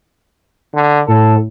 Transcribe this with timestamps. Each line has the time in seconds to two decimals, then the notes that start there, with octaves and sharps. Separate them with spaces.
0.75 D3
1.08 A2 A4